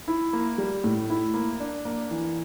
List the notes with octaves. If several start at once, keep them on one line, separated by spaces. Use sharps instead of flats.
E4
A#3
G3
A2
E4
A#3
D4
A#3
E3